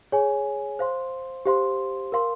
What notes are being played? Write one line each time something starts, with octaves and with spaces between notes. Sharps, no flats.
G#4 C#5 G#5
C5 F5 C6
G4 C5 F5 C6
A#4 F5 C6